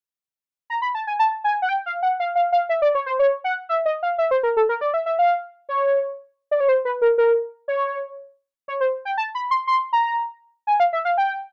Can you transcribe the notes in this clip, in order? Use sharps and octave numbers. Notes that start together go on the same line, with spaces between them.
A#5
B5
A5
G#5
A5
G#5
F#5
G5
F5
F#5
F5
F5
F5
E5
D5
C#5
C5
C#5
F#5
E5
D#5
F5
E5
C5
A#4
A4
A#4
D5
E5
E5
F5
C#5
D5
C#5
C5
B4
A#4
A#4
C#5
C#5
C5
G5
A5
B5
C6
C6
A#5
G#5
F5
E5
F5
G5